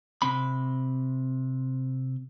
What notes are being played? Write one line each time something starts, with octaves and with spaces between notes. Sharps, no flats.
C3 C4 B5